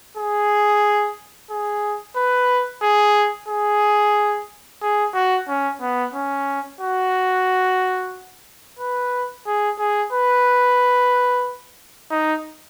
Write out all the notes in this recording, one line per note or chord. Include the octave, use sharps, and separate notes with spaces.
G#4
G#4
B4
G#4
G#4
G#4
F#4
C#4
B3
C#4
F#4
B4
G#4
G#4
B4
D#4